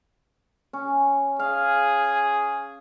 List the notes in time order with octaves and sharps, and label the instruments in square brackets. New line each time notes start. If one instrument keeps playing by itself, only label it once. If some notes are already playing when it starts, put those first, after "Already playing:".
[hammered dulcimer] C#4
[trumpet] G#4 [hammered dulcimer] F5